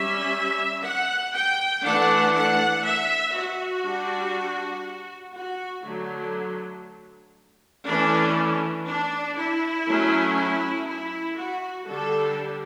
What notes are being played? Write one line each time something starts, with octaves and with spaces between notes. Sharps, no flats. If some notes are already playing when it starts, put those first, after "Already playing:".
Already playing: G3 C#4 E5
F#5
G5
E3 A3 D4 F#5
F#5
E5
F#4
G3 D4
F#4
D3 F#3 A3
E3 A3 C#4 D4
D4
E4
F#3 A3 C#4
E4
E4
F#4
D3 G3 D4 A4